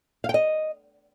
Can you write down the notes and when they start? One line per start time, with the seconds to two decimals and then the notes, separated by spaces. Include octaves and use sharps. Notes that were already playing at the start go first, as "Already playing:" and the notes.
0.24 F5
0.29 G5
0.34 D#5